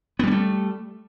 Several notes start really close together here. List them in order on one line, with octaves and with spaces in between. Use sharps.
B3 G3 C#4 A3